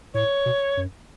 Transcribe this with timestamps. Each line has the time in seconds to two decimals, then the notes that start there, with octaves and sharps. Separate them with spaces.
0.14 A2 C#5
0.46 B2
0.77 F#2